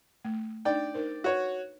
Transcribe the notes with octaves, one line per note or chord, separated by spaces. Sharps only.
A3
D4 D#4 D5 G5
D#4 A#4 C5
F#4 B4 C#5